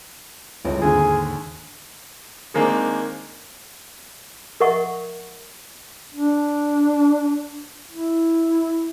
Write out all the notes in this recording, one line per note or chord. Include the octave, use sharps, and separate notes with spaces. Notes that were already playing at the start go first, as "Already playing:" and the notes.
G1 C#2 A2
D#2 G#2 D3 G#4
D#3 G#3 A#3 C4 D4
A#4 D#5 E5 F#5 C#6
D4
E4